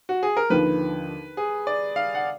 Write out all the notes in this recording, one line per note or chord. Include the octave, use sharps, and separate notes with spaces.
F#4
G#4
A#4
D#2 D3 F3 B4
G#4
D5
F5
F#5